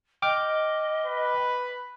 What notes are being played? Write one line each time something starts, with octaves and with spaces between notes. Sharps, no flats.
D#5 G5 D6 F6
B4